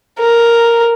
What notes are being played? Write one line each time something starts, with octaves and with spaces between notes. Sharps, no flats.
A#4